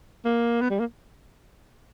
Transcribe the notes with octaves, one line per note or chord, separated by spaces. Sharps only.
A#3
B3
G3
A#3